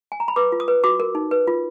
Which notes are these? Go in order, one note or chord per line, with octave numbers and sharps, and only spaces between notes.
G#5
A#5
B5
B4 D6
F4
D#6
B4
F#4 D6
A#4
D#4
B4
F4